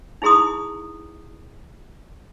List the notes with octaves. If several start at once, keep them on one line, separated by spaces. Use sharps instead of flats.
D#4 E4 G#4 A#5 C6 D#6